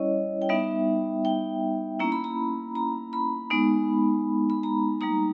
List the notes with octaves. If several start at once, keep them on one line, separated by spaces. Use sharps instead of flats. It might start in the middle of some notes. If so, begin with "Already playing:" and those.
Already playing: G3 C#4 E4 C#5 D#5
G5
G3 B3 D#4 E5
G5
A#3 C#4 E4 A#5
B5
A#5
A#5
B5
G#3 B3 D#4
B5
A#5
G3 A#3 D#4 A#5